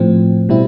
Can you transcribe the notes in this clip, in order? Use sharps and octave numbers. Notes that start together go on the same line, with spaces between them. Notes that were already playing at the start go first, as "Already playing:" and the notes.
Already playing: A2 F3 C4
B2 G3 C4 E4